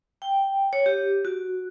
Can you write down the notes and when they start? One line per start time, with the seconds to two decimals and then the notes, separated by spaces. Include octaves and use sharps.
0.22 G5
0.73 C#5
0.86 G4
1.25 F#4